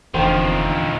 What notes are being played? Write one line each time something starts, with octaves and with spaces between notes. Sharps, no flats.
F1 E2 D3 D#3 F3 C5 G5